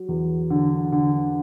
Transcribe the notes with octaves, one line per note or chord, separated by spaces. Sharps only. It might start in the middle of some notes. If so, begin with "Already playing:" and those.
Already playing: F#3
E2
D3
D3